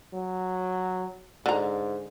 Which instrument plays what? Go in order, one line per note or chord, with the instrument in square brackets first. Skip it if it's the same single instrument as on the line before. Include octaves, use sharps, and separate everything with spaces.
[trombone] F#3
[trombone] G#2 [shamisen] D3 A#5